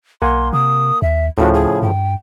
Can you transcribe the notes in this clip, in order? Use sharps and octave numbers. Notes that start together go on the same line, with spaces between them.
B1 A#3 F#5 G#5 C6
C3 D#6
D#2 E5
D2 A2 C#3 F3 F#4
G#4
G2 G5